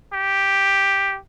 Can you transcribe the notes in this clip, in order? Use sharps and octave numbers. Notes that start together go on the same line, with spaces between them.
G4